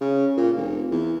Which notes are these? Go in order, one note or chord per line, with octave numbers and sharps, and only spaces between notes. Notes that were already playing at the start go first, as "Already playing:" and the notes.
C#3
A#2
F1
E2